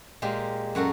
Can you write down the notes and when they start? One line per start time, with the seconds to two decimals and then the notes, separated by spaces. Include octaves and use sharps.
0.22 A#2 G#3 A#3 G4
0.75 F#2 F#4 A4 A#4